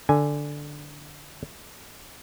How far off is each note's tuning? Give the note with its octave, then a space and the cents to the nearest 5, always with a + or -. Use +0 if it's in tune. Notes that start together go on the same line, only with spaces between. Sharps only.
D3 +0 G#5 +0